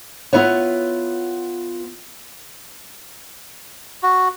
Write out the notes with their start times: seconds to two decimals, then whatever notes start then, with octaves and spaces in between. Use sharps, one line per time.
0.33 B3 E4 F4 B4 C#5
4.03 F#4